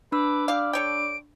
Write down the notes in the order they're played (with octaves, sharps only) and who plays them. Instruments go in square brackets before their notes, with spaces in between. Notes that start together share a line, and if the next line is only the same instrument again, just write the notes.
[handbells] D4 B5 E6 [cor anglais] B4 [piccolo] D6
[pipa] G4 F5 [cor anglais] D5
[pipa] A4 C#5 G5 [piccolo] D7